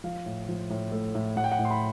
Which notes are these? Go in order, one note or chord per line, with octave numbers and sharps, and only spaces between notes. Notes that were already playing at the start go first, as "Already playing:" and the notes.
F3 F5
A2
F3
A2
A3
A2
A2 F#5
G5
F#5
A2
C6
B5